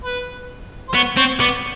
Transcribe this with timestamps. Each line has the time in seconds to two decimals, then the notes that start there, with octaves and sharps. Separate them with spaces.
0.05 B4
0.89 C5
0.95 B3 C#5
1.17 C4 C#5
1.40 B3 D5